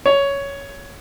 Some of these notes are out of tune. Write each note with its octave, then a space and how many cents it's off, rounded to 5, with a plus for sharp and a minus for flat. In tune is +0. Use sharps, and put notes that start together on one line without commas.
C#5 +10